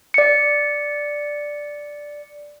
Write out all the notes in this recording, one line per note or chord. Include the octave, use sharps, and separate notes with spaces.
D5 C#7